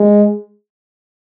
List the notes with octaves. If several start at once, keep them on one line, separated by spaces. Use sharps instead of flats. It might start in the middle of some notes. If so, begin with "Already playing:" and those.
Already playing: G#3